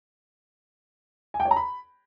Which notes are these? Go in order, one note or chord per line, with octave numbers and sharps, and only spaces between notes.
G#5
G5
C#5
A#5
B5